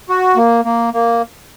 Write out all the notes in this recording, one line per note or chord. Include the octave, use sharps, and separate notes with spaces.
F#4
A#3
A#3
A#3